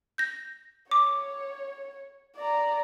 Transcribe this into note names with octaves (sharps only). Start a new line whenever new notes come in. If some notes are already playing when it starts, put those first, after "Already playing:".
G6 A#6
C#5 D6
D5 A#5